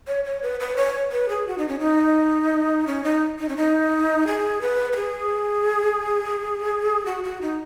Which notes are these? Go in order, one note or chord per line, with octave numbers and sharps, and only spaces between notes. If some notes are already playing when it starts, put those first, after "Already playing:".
C#5
C#5
B4
B4
C#5
B4
G#4
F#4
D#4
C#4
D#4
C#4
D#4
D#4
C#4
D#4
G#4
B4
B4
G#4
F#4
F#4
D#4